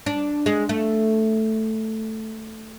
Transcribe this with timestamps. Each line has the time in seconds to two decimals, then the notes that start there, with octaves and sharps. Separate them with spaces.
0.06 D4
0.46 G#3
0.69 A3